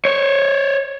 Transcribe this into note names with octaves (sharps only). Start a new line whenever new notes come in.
C5 C#5